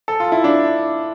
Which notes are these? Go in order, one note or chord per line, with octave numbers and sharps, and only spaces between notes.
A4
F4
E4
D4